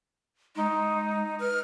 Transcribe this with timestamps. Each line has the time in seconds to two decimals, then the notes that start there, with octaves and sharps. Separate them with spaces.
0.56 G#3 D#4
1.40 B4 F6